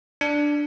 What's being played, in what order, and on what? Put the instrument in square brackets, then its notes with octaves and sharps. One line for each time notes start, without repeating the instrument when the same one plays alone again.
[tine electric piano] D4